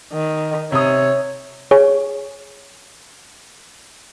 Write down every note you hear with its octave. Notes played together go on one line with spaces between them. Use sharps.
D#3
C3 C#5 D#6
G#4 C#5